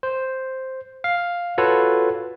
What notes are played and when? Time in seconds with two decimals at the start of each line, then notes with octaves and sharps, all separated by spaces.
0.03 C5
1.04 F5
1.58 F4 F#4 A4 B4 C#5